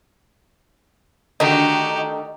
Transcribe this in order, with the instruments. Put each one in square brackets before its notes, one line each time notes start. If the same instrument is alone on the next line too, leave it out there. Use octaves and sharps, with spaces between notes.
[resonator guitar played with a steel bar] D3 D#3 A3 [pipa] D#4 [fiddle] F#4 G4